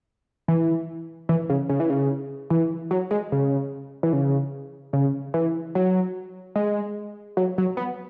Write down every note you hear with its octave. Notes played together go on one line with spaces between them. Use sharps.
E3
E3
C#3
C#3
E3
C#3
E3
F#3
G#3
C#3
E3
C#3
C#3
E3
F#3
G#3
F#3
F#3
B3